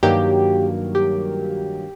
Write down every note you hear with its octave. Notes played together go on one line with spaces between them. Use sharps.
G2 D#3 F#3 A#3 G4
G4